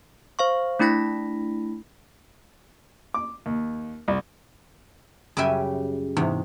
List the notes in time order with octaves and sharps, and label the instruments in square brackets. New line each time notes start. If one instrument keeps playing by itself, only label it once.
[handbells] C5 F5 C#6
A3 D4 E4 B5 A#6 B6
[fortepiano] D6
D#2
C2
[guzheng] F#2 C#3 G3 G4 E5 G#5
E2 G#2 C3